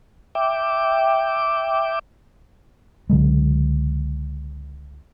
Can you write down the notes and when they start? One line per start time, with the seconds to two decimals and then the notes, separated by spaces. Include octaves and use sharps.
0.35 E5 G5 D6
3.10 C#2 D3 F#3 G#3